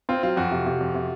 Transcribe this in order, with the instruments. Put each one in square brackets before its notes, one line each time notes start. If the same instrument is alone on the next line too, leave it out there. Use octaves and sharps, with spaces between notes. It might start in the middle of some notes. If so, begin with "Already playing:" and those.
[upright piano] C4 [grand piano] F4
[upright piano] F#3 [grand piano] F4
[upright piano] F2 [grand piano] F#4
[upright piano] C3
C3
F2
C3